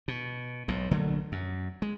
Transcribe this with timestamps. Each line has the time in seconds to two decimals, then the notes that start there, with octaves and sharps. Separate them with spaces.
0.08 B2
0.68 B1 G#2
0.91 A#1 D3 F#3 A3
1.32 F#2
1.82 G#3